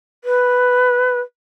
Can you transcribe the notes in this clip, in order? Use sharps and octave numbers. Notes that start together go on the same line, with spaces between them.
B4